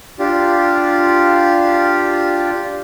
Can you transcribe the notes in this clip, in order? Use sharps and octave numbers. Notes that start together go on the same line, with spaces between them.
D4 F4 G4